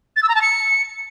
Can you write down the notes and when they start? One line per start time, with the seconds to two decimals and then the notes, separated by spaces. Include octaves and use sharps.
0.16 A6
0.23 E6
0.29 A#5
0.35 A5
0.42 C#7